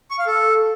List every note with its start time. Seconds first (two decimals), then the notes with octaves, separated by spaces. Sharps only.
0.11 C#6
0.19 F5
0.27 A4